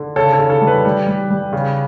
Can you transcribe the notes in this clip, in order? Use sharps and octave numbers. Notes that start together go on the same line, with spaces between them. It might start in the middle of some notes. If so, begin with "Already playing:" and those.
Already playing: D3
C#3 A4 C#5
A4 C#5
C#3
A4
G3
B4
G3
G3
G3
C#3